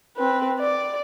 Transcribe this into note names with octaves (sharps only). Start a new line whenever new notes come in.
C4 B4
D5